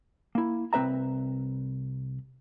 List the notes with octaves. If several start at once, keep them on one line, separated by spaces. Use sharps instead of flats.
A#3 E4
C2 C4 B4 E5 A#5